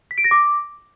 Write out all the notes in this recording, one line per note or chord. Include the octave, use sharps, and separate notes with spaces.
B6
D7
A#6
D6